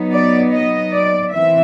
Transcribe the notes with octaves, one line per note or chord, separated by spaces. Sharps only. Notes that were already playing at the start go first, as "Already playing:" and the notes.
Already playing: F#3 B3 D#4
D5
D#5
D5
E3 C4 E5